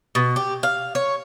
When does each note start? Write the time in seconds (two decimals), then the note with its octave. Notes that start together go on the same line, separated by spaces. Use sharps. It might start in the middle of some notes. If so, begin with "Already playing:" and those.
0.15 B2
0.36 G4
0.63 F5
0.95 C#5